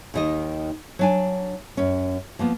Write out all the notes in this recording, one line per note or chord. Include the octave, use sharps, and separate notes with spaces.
D#2 D#3 D#5
F#3 D4 G#5
F#2 C#4
F3 A#3 B3